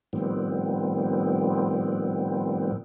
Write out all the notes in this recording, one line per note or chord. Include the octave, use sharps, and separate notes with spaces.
A2 D#3 F3 G3 B3 C4